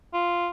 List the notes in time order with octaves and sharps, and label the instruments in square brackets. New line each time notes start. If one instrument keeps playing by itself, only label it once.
[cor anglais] F4